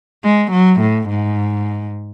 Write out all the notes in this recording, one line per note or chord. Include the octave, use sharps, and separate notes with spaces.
G#3
F#3
A2
G#2